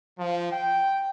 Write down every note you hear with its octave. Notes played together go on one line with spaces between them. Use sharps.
F3
G5